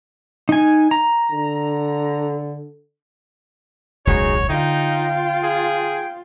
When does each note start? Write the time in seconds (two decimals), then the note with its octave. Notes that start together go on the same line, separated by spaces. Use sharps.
0.49 D#4 G#5
0.91 A#5
1.31 D3
4.07 E1 C#2 F#2 D#4 F#4 G#4 C#5
4.49 D3 D#4 F4 G5
5.44 G#4